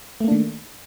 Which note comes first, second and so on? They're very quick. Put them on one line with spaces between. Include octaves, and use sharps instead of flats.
A3 A#3 D4 D#3